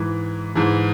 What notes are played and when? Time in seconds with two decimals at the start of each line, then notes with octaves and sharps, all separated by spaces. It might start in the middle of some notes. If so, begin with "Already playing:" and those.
Already playing: G#2 E3
0.55 G#2 E3 G#4